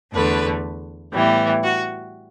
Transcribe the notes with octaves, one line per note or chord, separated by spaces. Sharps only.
E2 D3 A3 B4
A2 E3 G3 B3
F#4